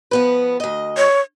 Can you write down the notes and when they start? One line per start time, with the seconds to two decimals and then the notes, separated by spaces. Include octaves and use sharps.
0.11 F3 B3 B4
0.60 D2 D#5
0.97 C#5